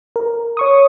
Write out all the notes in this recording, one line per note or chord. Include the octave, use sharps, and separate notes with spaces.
A#4
C#5 C#6 D#6